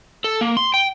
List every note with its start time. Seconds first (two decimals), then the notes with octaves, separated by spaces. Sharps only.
0.24 A4
0.41 A#3
0.57 C6
0.74 G5